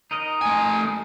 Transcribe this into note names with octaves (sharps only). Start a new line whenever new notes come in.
D#4 A#4 D#5
A3 G#5